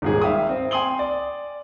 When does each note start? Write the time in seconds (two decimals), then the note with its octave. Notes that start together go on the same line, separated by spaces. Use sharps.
0.02 D#1 G#2 G#4
0.22 E5 F5 G5 D#6
0.49 C4
0.71 G5 G#5 C6 D#6 F#7 G7
0.99 D5